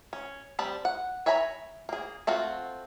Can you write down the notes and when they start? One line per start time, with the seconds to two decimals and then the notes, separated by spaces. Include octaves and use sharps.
0.13 C#4
0.59 G3 C4 A5 B5
0.85 F#5
1.26 C#5 E5 G#5 A#5 B5
1.89 A#3 G#4
2.27 A3 C4 F4 F#4